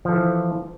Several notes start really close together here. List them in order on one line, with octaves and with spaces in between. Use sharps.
F3 A4 E3